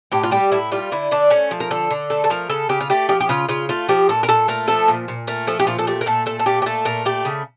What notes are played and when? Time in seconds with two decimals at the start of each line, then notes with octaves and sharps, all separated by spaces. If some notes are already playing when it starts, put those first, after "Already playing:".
0.12 A2 G4
0.23 F4
0.31 G3 G4
0.52 A2 E4
0.72 G3 F4
0.92 D3 E4
1.11 D3 D4
1.31 A3 C#4
1.51 F3
1.60 A#4
1.71 D3 A4
1.91 D3
2.10 A3 A4
2.24 A4
2.30 F3 A#4
2.50 C#3 A4
2.69 C#3 G4
2.81 F4
2.90 A3 G4
3.09 F3 G4
3.21 G4
3.29 C#3 F4
3.49 C#3 F4
3.69 A3 F4
3.89 F3 G4
4.09 A#2 A4
4.23 A#4
4.28 A#2 A4
4.48 A3 A#4
4.67 F3 A4
4.88 A#2
5.08 A#2
5.27 A3 A#4
5.47 F3 A4
5.60 G4
5.67 A#2 F4
5.78 A4
5.87 A3 G4
6.01 A#4
6.06 A#2 A4
6.26 A3 A4
6.39 A4
6.46 A#2 G4
6.62 G4
6.66 A3 A4
6.85 A#2 A#4
7.05 A3 G4
7.25 C#3